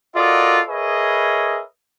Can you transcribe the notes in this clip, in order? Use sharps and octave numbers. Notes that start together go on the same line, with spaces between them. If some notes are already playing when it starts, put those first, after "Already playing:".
F4 F#4 A4 A#4 D5 D#5
G#4 A#4 B4 C#5 D#5 E5